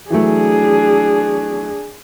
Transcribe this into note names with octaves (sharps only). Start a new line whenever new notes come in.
E3 F#3 A3 D4 G#4